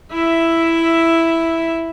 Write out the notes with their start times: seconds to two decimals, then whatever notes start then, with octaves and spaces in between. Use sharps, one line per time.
0.12 E4 E5